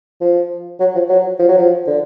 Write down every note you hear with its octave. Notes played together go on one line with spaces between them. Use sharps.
F3
F#3
F3
F#3
F3
F#3
F3
D3